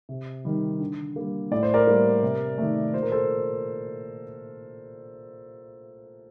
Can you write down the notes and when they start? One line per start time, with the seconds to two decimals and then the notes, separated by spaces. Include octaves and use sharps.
0.09 C3
0.45 D#3 G3
0.80 D3
1.16 G3 A#3
1.51 A2 D5
1.63 C5
1.74 A#4 D5
1.87 G3 A#3
2.22 C3
2.58 D#3 A3
2.93 A#2 C5
3.03 A#4
3.12 A4 C5